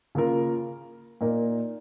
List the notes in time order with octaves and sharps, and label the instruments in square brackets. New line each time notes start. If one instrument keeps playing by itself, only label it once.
[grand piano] C#3 A#3 F4 A#4
A#2 A#3 D#4 A#4